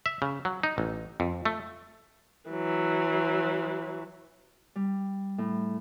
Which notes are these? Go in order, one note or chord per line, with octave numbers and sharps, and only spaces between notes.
E5
C#3
F#3
D#4
A1
F2
A3
E3 F#3
G3
A2